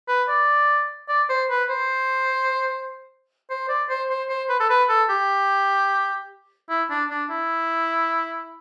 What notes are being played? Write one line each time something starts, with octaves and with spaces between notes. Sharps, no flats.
B4
D5
D5
C5
B4
C5
C5
D5
C5
C5
C5
B4
A4
B4
A4
G4
E4
D4
D4
E4